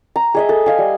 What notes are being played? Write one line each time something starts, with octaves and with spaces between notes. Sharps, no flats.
A#5
G#4 D#5 E5
A4
D#5 F5 G#5
G3